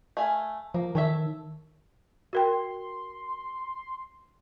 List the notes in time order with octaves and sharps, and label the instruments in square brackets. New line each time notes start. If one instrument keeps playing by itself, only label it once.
[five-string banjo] A3 F5 G#5
[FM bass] F3 [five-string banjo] A#3
[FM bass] D#3 [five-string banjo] A4 C#5 E5
[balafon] F#4 A#4 G5 [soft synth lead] C6